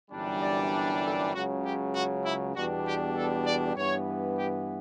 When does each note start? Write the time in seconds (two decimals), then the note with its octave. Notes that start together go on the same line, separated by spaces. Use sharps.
0.11 G1 F#2 E3 G3 D4
0.41 D5
1.02 A4
1.33 C#2 C#3 F#3 F#4
1.63 G4
1.93 F#4
2.24 E4
2.54 E2 B2 G3 D4 F#4
2.85 G4
3.15 A4
3.46 D5
3.76 G2 E3 B3 C#5
4.37 G4